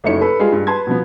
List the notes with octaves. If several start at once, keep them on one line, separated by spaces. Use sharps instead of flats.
F#1 A3 D#4 E4 C#5 C#7
A4 B4 B5
G3 G#3 F4 G#4
G2
B4 A5 C6 G#6
B2 F3 B3